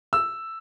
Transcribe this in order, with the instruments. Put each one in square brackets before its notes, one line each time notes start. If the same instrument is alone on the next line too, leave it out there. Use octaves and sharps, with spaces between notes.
[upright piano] E6